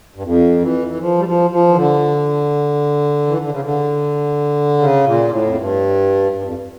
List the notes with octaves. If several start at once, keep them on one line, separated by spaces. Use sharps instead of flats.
G2
F2
E3
E3
F3
G3
F3
F3
E3
D3
E3
D3
C#3
D3
C#3
A#2
A2
F2
G2
G2
F2